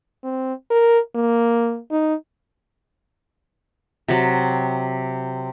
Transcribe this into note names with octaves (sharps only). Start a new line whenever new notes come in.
C4
A#4
A#3
D#4
C3 F#3